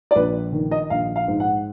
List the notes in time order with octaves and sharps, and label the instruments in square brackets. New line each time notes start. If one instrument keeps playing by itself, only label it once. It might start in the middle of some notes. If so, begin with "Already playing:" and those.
[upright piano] D5
A#1 B4
D#3
D#5
A#1 F5
F5
G#2
F#5